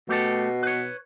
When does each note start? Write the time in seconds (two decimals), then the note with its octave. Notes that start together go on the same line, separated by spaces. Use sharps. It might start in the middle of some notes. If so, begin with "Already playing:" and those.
0.09 B2 A3 G4 A4
0.63 B4 C#5